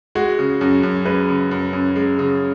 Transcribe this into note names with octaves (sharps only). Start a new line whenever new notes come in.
G#3 F#4
C#3
F#2
F#2
G#3 B4
C#3
F#2
F#2
G#3
C#3